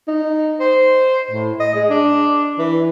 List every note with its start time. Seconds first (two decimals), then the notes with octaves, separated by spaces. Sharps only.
0.08 D#4
0.60 C5
1.31 A2
1.60 D#5
1.75 G#3
1.90 D4
2.58 E3